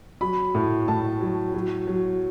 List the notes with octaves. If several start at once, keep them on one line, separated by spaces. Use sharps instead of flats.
F#3 B5
A2
A2 A5
F#3
F#3
F#3